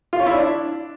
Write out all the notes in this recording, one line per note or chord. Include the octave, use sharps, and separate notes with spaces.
F4
C#5
E4
D4